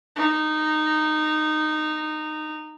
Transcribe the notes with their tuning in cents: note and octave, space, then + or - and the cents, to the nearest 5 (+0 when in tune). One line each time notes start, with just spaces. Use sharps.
D#4 -15